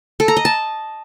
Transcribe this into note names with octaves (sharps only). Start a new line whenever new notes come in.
A4
A#5
D#5
A5